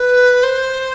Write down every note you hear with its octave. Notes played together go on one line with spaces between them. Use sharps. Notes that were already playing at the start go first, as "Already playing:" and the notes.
Already playing: B4
C5